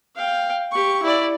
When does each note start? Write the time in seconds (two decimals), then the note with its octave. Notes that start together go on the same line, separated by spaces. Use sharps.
0.16 F5 G5
0.72 G4 C#6
1.03 E4 D5